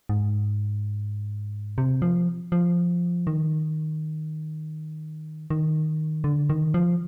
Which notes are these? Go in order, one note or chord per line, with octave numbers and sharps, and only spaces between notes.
G#2
C3
F3
F3
D#3
D#3
D3
D#3
F3